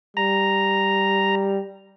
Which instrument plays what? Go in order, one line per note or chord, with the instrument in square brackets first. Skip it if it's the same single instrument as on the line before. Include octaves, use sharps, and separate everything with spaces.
[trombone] G3 [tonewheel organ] A#5